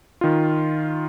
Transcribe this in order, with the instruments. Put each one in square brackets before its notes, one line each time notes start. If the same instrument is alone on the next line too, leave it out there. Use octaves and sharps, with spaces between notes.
[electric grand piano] D#3 F4